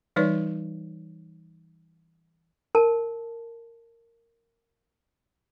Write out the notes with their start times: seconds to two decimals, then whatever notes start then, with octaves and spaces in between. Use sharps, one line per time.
0.16 E3 G3 D#4 B4 C#5 D5
2.75 A#4 A5